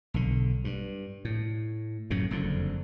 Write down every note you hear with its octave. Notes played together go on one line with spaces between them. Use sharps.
B1 D3
G2
A2
F#2 A2 C#3
F#1 F2 D3